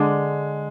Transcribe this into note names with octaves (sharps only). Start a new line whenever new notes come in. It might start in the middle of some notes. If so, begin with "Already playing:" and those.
Already playing: D3 G#3